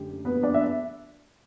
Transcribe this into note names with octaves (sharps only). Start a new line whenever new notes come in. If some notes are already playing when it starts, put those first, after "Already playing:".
Already playing: F#2 D3 A3 G4
B3 B4
D4 D5
E5